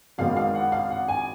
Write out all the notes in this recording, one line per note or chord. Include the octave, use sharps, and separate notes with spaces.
G#1 F#2 D#3 G#3 B3 F5
F5
F#5
F5
F#5
G#5